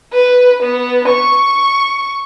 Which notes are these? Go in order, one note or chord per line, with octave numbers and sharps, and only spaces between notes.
B4
B3
C#6